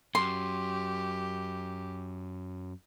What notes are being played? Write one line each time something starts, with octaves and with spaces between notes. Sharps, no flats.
F#2 G4 C6